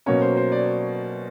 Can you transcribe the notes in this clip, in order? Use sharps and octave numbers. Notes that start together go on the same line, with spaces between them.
B2 F#3 A#3 C#4 C#5
C5
C5
D5